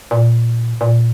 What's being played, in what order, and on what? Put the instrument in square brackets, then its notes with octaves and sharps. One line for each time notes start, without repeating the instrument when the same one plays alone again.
[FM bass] A#2
A#2